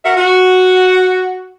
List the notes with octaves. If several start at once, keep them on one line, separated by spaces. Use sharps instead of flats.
F#4 A#4 E5
F#4